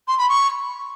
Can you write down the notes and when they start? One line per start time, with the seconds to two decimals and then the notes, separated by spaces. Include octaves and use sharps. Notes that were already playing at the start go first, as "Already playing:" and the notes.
0.07 C6
0.18 B5
0.28 C#6